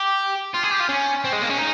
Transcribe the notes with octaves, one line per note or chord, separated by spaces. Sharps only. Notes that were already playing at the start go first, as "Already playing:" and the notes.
Already playing: G4
F4
G#4
G4
F4
C#4
C4
G#3
A#3
C#4
D#4